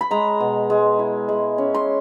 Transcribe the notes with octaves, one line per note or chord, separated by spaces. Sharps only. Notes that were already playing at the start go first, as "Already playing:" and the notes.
B5
G#3 A#5
B2
G#3
E4
G#3
C#4
C6